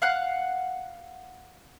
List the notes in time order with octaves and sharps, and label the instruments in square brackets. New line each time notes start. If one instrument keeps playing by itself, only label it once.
[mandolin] F5 F#5 F#6